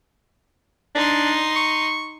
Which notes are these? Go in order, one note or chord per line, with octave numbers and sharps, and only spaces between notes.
D4 D#4 C6
C#6